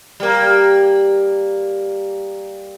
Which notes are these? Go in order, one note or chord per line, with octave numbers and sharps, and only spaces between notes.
G3 A#3